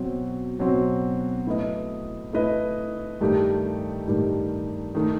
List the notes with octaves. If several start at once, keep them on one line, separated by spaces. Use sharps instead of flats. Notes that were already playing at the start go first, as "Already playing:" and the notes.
Already playing: B2 F#3 C4 F#4
B2 F#3 C4 F#4
A3 E4 B4 D#5
A3 E4 B4 D#5
G2 D#3 A3 D#4 G4
G2 D#3 A3 D#4 G4
D#3 A3 D#4